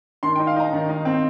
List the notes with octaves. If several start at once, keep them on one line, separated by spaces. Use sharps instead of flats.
D#3 C6
D#4 G5
F5
D#4 A#5
D#3
D#4
C4